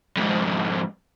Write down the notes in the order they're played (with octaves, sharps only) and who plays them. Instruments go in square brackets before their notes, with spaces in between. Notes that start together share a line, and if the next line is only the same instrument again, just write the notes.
[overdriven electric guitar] F2 G#2